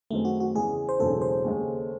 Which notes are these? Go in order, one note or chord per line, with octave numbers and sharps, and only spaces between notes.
F#2 D#3 G#3 A3 C4
F#4
F#4
E2 C#3 G#3 G#4
C5
E1 E2 C#3 F#3 C4 A4
C5
D#2 C#3 G#3